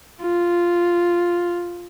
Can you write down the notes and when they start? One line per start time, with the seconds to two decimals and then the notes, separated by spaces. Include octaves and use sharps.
0.22 F4